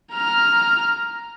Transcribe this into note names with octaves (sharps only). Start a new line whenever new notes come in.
A#5 F6